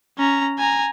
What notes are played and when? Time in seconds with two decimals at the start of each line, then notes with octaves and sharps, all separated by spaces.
0.18 C#4 A#5
0.58 G#5 A#5